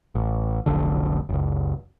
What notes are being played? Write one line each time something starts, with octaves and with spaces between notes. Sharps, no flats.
A1
F1 B1 D3
F#1 C#2